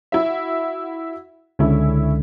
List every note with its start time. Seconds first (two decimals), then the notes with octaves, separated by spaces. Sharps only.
0.12 E4 F#4 E5
1.59 C#2 D3 C#4 E4